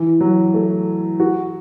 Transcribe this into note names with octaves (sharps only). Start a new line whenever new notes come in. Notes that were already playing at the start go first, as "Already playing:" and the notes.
Already playing: E3
F#3
A3
F#4